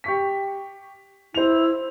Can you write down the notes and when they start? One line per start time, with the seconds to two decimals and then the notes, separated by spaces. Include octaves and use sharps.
0.04 G4 C#6 B6
1.34 E4 C5 F7